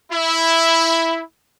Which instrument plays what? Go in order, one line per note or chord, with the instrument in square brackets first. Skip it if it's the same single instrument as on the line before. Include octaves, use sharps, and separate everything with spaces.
[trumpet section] E4